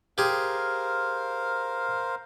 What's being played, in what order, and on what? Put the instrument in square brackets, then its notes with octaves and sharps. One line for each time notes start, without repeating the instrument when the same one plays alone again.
[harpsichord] G4 G#4 [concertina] A#4 C5 F5